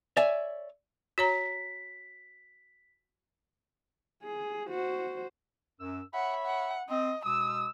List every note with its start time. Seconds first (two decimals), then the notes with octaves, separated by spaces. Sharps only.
0.17 C#5 D5 E5 G#5
1.18 F#4 C#5 A#5 B6
4.23 G#4
4.69 F#4 C5
5.81 F#2 E6
6.14 C#5 E5 F#5 B5
6.46 F#5
6.89 C4 D#5
7.26 B2 G#3 D#6 E6